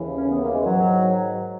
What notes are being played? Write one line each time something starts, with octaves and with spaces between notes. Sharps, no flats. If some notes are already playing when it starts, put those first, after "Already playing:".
Already playing: D#2 C#3 E3
C#4
B3
A#3
G#3
G#2 D#3 F#3